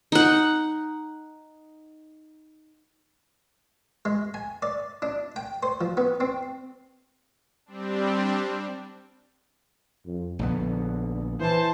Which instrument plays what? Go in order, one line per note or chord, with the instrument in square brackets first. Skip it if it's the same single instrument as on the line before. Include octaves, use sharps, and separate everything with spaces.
[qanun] D#4 F#5
[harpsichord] G#3
G#5
D5
D4
G5
C5
F3
B3
C4
[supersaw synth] G3 C4 D4
[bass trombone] F2
[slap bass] A#1 B3 [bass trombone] D3
[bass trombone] E3 [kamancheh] C5 A5